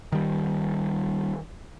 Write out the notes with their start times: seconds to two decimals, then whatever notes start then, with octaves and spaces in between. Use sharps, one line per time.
0.12 D#3 G3